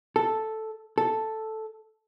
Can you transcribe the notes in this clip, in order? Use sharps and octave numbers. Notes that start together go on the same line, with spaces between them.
A4
A4